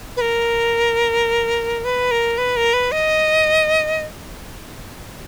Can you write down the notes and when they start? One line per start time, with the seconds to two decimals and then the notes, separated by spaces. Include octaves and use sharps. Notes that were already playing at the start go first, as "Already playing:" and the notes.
0.17 B4
0.21 A#4
1.84 B4
2.11 A#4
2.38 B4
2.56 A#4
2.73 B4
2.92 D#5